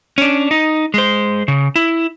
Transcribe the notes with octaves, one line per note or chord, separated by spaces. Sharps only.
C#4 D4
D#4
G#3 C5
C#3
E4